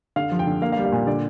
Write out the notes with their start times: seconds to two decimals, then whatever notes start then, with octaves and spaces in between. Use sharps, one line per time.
0.16 D3 F5
0.32 F3
0.39 G5
0.47 D3
0.62 A#3 F5
0.72 F5
0.77 G3
0.85 F5
0.92 A#2
1.07 D3 D5